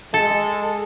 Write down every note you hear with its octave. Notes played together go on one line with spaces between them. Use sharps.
G#3 A4